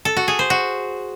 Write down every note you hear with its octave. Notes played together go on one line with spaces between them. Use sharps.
A4
F#4
G#4
C5
F#4